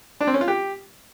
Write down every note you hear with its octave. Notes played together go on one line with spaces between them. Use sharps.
D4
C4
C#4
F4
G4